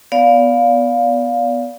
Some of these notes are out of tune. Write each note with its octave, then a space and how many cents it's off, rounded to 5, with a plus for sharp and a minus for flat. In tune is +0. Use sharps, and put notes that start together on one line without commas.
B3 +0 D5 -25 F5 +10